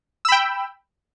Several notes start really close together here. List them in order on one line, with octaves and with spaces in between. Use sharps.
E6 B5 G5